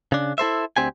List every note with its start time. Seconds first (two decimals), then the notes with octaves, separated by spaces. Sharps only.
0.12 C#3 D4
0.38 E4 A4 C5 E5
0.77 D2 C4 G4 G#5